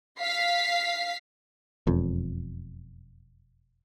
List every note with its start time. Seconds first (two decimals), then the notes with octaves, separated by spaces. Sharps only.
0.20 F5 B6 C7
1.87 E1 F2